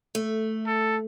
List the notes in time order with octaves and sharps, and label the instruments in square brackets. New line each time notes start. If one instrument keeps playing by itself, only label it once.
[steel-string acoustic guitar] A3
[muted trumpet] A4